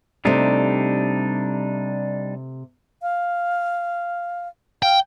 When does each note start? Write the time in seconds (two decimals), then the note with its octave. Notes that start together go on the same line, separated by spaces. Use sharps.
0.25 C3 G3 A3 D4 D#4
3.02 F5
4.83 F5 G5